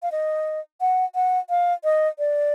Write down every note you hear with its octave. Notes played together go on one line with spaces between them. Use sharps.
F5
D#5
F#5
F#5
F5
D#5
D5